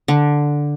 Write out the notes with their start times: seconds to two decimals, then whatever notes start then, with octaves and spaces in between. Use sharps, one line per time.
0.08 D3